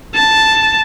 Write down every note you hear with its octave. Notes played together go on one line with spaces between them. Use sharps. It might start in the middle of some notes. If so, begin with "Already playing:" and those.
A5